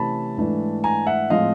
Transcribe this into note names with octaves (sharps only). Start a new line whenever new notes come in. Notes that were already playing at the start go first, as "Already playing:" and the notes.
Already playing: C3 E3 A3 C#4 A5 B5
G#2 E3 A3 D4
G#5 A#5
E5 F#5
A2 F3 G#3 C4 D#5 F5